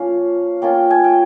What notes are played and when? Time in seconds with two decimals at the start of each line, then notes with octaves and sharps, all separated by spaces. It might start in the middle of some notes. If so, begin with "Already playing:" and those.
Already playing: F3 A#3 C#4 F5
0.62 A#3 C#4 F4 G5
0.91 G#5
1.04 G5